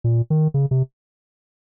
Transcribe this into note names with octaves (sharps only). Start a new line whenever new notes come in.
A#2
D#3
C#3
C3